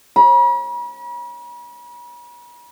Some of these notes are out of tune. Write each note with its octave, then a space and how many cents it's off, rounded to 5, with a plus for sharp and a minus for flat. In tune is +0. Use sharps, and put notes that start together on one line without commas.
B5 -45